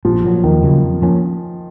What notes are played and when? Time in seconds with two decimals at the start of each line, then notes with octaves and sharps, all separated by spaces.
0.05 A#1 F3
0.24 A#2 F#3
0.44 D#2 D#3
0.63 C#3 F#3 A#3
0.83 F2
1.02 F3 A#3 C#4